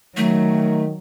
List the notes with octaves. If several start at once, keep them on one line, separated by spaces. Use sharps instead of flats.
D#3 F#3 A3